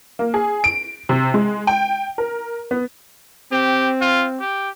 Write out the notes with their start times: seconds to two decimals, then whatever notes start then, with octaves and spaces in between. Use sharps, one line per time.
0.19 A#3
0.34 G#4
0.64 D7
1.09 C3
1.34 G#3
1.67 G5
2.18 A#4
2.71 B3
3.52 C4 G4
4.01 F4
4.40 G4